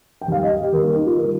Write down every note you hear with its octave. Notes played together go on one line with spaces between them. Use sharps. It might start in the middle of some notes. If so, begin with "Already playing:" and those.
G5
D#2 D#3 G3 F5
D#5
G4
D#2 D#3 G3 A#4
A#3
D#4
F4
D#3 G3 A#4